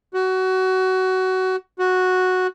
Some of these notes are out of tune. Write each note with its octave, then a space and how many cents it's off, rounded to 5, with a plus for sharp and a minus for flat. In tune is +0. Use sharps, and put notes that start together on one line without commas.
F#4 +20
F#4 -5